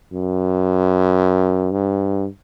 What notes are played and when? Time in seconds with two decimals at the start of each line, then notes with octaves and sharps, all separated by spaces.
0.13 F#2
1.72 G2